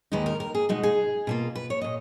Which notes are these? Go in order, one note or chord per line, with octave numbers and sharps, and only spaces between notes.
D#2 D#3 G#3 D#4 B4
A#4
A#4
G#4
B2 G#3 D#4 F#4
G#4
B2 A#3 F4
B4
C#5
A#2 D#5